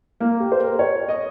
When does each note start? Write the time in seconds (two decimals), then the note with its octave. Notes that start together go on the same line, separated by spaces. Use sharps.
0.20 A#3
0.40 G4
0.52 C5
0.59 A#4
0.79 C#5
1.08 D#5